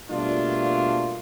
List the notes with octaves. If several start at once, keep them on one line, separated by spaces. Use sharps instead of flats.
B2 G3 A3 A#3 D4 F4